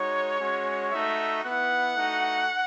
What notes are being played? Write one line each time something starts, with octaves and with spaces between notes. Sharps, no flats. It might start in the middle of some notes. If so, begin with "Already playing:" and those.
Already playing: G#3 D#4 F#4 C#5
G#3 C#4 F#4
A3 D#4 F#4 E5
B3 E4 F#5
A3 D#4 F#4